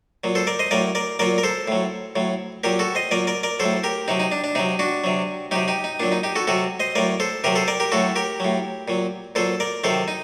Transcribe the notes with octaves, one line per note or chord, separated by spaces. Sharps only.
A#2 F#3
A4 C5
A#4 D5
C5 D#5
A2 F#3 A#4 D5
A#4 D5
A#2 F#3 A#4 D5
A#4
A4 C5
A2 F#3
A2 F#3
A#2 F#3 G4 A#4
F#4 A4
C5 D#5
A#2 F#3 A#4 D5
A#4 D5
A#4 D5
A2 F#3 A4 C5
G4 A#4
C3 F#3 D#4
D#4
D4
D4
C3 F#3 D#4
D4 F#4
C3 F#3
C3 F#3 D#4 G4
D#4 G4
D#4
A#2 F#3 D4
D#4
D#4 G4
F#4 A4
C3 F#3 F#4 A4
C5 D#5
A2 F#3 A#4 D5
A4 C5
C3 F#3 G4 A#4
A4 C5
A#4 D5
G4 A#4
A2 F#3 F#4 A4
G4 A#4
A2 F#3
A#2 F#3
A#2 F#3 A4 C5
A#4 D5
C3 D#3 F#3 A4 C5
D#4